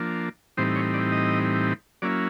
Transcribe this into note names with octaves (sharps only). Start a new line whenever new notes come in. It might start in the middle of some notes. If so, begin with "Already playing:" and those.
Already playing: F3 A#3 D4
A2 E3 G3 C4 D#4 C5
C#5
D5
D#5
F#3 A#3 C#4 E4 D5